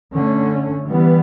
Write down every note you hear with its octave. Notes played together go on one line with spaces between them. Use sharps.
D3 A3 C#4
E3 G3 B3